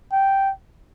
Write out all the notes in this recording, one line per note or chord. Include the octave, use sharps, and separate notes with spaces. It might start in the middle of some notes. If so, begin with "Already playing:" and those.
G5